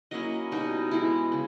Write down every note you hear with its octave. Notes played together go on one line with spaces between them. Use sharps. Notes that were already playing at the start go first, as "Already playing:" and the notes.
F#3 A#3 C#4 E4 D#5
B2 G3 B3 D#4 D#5
E3 G#3 B3 E4
C#3